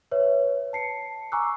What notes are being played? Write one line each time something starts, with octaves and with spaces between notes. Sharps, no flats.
B4 C#5 E5
A5 C7 C#7
G#5 A#5 C#6 D6 E6 F#6